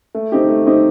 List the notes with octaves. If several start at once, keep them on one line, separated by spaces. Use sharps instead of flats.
A3
C4 D#4 G4
A3
C4 D#4 G4